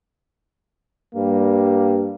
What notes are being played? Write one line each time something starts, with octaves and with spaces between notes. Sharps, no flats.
G2 G3 A#3